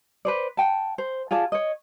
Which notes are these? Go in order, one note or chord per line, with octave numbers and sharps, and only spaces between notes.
B4 C5 D5
F#5 G5 A5
C5
F4 G#4 D5 A5
C#5 D#5